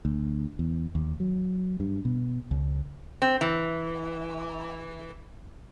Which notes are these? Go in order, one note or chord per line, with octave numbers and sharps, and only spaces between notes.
D2
E2
D#2
F#3
G2
B2
C#2
C4
E3